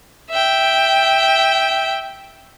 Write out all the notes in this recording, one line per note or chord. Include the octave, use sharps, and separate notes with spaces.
E5 G5